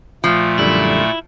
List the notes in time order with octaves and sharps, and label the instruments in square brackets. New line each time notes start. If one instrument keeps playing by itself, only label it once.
[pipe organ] A#2 A3 [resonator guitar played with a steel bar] F3
[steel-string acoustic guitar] F#2 D3 G3 [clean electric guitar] E4